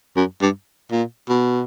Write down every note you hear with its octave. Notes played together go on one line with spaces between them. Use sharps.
F#2
G2
A#2
B2